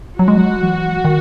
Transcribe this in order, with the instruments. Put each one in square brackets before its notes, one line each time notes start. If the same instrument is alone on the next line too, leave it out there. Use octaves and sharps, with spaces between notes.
[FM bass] F#3 [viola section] F#4
[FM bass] G#3
F#3
E3
D#3